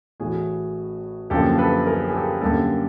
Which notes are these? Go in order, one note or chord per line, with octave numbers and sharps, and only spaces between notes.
A1 A2 E3 F#4 G#4
F#2 D3 F3 A#3 G4 A4
A4 B4
G#4 A#4
G#4
G4 A4
F#2 D3 G3 A#3 G4 A4